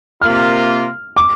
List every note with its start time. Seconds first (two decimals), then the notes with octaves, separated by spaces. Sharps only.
0.21 C3 A#3 F4 F6
1.16 D6